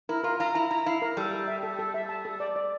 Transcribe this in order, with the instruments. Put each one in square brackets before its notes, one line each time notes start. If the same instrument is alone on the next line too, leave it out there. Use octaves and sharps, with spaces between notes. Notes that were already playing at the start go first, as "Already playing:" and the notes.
[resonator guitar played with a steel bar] E4 [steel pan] A#4
[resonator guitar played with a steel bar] F4 [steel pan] A#4
[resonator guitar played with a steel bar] F4 [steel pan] A#5
[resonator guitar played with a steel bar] E4 [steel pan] A#5
[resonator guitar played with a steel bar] E4 [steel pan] A#5
[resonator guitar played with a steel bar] E4 [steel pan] F5
[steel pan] A#4
[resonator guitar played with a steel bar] G3 [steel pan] A4
[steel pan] A4
E5
A4
A4
E5
A5
A4
D5
D5